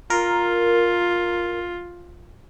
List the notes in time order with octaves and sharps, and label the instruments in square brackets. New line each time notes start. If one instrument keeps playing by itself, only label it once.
[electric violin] F4 [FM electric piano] A#4